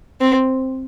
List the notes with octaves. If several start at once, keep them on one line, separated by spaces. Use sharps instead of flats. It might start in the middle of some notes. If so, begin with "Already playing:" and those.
C4